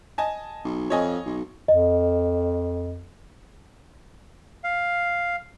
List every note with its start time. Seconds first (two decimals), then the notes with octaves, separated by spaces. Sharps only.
0.18 D#5 G#5 A5
0.64 B1
0.90 F2 C#5 D#5 G#5
1.26 B1
1.68 F2 D#5
4.64 F5